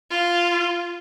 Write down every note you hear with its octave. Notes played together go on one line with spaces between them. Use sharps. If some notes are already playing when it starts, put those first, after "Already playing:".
F4